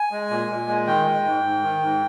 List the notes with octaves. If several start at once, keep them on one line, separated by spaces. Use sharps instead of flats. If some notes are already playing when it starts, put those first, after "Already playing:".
Already playing: G#5
G#3
A#2
A#2
G#3
D#3 G5
G#3
G#2
G#2
D#3
G#2